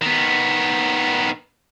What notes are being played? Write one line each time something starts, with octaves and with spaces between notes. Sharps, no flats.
D#3 B3